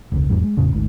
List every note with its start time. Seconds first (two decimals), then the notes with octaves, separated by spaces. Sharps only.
0.12 E1 C#2
0.30 F1 E2 G#2 F#3
0.43 G#3
0.57 F1 E2 A2 C#3
0.72 G#1 D2 G#2